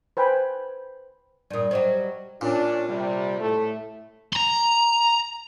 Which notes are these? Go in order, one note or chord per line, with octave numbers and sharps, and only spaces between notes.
B4 C5 G5 G#5 B5
G2 A#2 D5 D#6
F#3 G3 C#4 C5 D#5
A#2 C#4 D4
C3 G3
A2 A3
A#5 C6